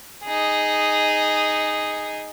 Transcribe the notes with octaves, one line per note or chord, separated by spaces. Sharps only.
D#4 G#4